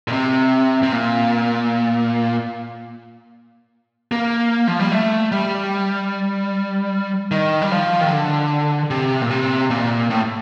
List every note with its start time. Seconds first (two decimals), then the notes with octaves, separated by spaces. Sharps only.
0.08 A#2
0.12 C3
0.83 C3
0.92 A#2
4.12 A#3
4.67 F3
4.80 G3
4.92 A3
5.32 G3
7.31 D#3
7.62 G3
7.72 F3
8.01 D#3
8.10 D3
8.91 C3
9.22 A#2
9.31 C3
9.70 A#2
10.10 A2